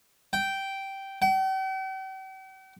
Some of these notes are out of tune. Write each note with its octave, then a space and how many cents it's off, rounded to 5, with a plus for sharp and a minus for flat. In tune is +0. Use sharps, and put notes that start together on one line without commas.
G5 -10
G5 -45